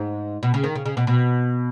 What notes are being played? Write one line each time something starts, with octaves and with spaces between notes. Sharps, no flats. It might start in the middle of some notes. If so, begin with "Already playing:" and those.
Already playing: G#2
B2
C#3
D#3
C#3
C#3
B2
B2